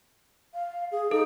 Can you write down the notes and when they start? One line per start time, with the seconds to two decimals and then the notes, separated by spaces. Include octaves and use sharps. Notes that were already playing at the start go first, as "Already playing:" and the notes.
0.54 F5
0.92 G#4
1.11 D#4 A4